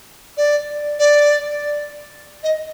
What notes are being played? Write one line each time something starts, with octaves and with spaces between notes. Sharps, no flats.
D5
D5
D#5